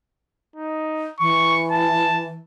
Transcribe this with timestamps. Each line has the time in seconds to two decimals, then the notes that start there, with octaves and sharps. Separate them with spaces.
0.56 D#4
1.20 E3 C#6
1.71 A5